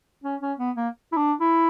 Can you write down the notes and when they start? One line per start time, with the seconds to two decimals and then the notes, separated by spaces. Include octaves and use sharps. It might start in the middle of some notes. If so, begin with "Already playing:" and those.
0.24 C#4
0.41 C#4
0.59 B3
0.76 A#3
1.12 E4
1.17 D4
1.40 E4